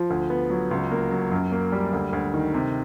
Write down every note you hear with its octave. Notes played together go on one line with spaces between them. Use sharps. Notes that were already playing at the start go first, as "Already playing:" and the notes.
Already playing: F3
D2
B3
F#3
C#2
A#3
F#3
F#2
A#3
G3
D2
D2
D#3
C3